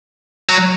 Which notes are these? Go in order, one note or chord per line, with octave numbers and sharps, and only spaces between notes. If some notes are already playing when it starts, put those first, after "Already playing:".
F#3